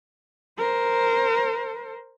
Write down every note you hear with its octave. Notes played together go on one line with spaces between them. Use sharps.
A#4 C5